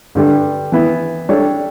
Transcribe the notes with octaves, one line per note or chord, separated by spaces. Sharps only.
G2 D3 G3 D4 A4
E3 B3 E4
G3 D4 A4 C#5